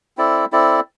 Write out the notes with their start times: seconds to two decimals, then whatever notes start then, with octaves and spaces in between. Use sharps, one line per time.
0.17 C4 E4 A4 D5
0.52 C4 E4 A4 D5